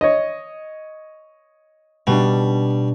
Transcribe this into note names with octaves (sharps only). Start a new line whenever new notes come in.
C#5 D#5
B2 G3 D4